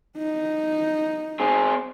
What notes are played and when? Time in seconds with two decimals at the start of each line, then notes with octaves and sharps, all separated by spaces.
0.18 D#4
1.40 C4 G#4